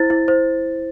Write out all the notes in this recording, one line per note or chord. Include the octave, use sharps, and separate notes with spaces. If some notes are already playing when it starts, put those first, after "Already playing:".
Already playing: E4 C5 A6
E4
C5